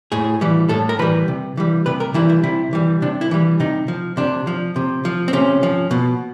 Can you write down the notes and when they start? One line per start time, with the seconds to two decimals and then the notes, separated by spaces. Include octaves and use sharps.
0.12 A2 G#4
0.41 E3 G3
0.69 A2 A4
0.89 A#4
0.99 E3 G3 B4
1.28 C3
1.57 E3 G3
1.86 C3 B4
2.00 A#4
2.14 E3 G3 E4
2.29 E4
2.43 C3 E4
2.73 E3 G3
3.02 C3 D4
3.21 E4
3.31 E3 G3
3.60 C3 D#4
3.88 F3
4.17 C3 D4
4.47 F3
4.76 C3
5.05 F3
5.28 C4
5.33 C3 C#4
5.63 F3
5.91 B2